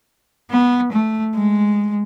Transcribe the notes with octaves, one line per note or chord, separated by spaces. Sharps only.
B3
A3
G#3